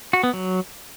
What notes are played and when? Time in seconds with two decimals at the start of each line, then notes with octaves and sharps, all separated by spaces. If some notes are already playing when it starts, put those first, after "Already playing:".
0.13 F#4
0.23 B3
0.33 F#3